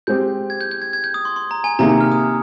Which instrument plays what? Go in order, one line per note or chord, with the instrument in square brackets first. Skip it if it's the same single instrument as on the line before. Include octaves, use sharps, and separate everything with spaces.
[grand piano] G#3 C4 G4 [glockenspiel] G6
[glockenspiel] G#6
G6
G6
G#6
G#6
G6
D#6
C6
C6
A#5
G#5
[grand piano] C3 D#3 A#3 D#4 G#4 [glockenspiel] A#5
[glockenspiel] A#5
F6
D#6